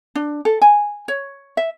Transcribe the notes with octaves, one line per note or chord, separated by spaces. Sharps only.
D4
A4
G#5
C#5
E5